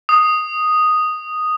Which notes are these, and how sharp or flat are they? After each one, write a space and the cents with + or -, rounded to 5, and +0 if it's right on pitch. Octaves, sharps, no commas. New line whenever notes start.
D#6 -5